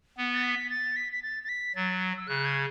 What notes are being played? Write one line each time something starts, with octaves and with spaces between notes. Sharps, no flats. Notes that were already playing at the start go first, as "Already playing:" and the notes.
B3
A6
B6
A6
B6
B6
A6
A6
B6
F#3 A6
E6
C#3 F#6
G#6